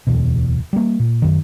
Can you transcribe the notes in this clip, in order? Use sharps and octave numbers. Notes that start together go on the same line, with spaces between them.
D1 E2 B2
G3 A#3
A#2
F#2 D#3